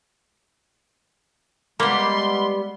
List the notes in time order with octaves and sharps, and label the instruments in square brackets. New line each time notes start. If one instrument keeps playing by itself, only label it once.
[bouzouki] G3 B3 [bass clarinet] G#3 [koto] A#3 [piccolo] C6